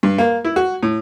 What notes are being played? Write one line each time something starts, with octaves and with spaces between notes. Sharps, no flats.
G2
A#3
E4
F#4
A2